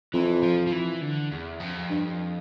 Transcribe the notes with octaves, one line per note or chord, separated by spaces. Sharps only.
F2 E3
F3
F3
E3
D3
E2
F2
G2